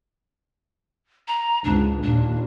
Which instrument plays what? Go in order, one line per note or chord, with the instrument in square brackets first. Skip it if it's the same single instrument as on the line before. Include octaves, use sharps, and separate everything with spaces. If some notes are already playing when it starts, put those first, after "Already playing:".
[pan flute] A#5
[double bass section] C#2 G#2 [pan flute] D4
[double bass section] D#2 A#2 [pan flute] D4